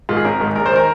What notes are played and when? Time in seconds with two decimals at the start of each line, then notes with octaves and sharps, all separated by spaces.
0.09 G#2 D#3 F4
0.16 G#4
0.25 G#1 A#4
0.40 G#2 D#3
0.55 A#1 A#4
0.66 C5
0.72 D#3 A#4